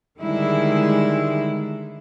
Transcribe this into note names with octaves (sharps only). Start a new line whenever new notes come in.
D3 D#3 G3 G#3 E4